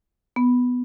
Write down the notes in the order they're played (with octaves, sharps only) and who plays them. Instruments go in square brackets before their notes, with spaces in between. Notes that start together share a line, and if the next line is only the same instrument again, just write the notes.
[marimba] B3